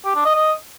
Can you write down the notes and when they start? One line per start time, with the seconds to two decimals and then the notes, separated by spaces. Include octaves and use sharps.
0.05 G4
0.15 D4
0.25 D#5
0.35 D#5